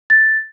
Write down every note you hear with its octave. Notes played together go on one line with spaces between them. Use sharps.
A6